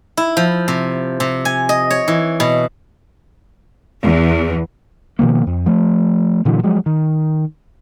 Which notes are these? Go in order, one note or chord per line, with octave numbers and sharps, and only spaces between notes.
E4
F3
C3
C3
G#5
D#5
C#5
E3
B2
E2
B2 D#3 F3 A#3
F2
F3 A3
A#2 D3 E3 F#3
F3 F#3 G#3
D#3